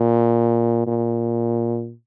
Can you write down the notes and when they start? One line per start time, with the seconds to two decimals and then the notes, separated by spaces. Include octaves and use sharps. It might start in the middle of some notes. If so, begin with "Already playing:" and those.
Already playing: A#2
0.87 A#2